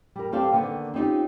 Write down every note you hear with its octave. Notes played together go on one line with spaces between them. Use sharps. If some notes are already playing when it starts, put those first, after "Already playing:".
G3 A#4
G3 C4 G4 A4 C5 F5
D3 D#3 A#3 B3
C4 C#4 D#4 F4 G4